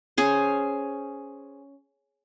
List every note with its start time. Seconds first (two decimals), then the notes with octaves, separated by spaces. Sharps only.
0.18 C#4 G#4 C5